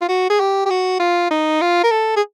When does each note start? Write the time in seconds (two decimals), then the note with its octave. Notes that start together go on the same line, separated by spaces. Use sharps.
0.02 F4
0.09 F#4
0.30 G#4
0.40 G4
0.66 G4
0.70 F#4
1.00 F4
1.31 D#4
1.61 F4
1.84 A#4
1.91 A4
2.17 G#4